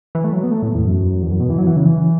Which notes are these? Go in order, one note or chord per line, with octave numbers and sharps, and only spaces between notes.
E3
A3
F#3
B3
A3
A2
E2
F#2
E2
F#2
B2
E3
F#3
E3
C#3
E3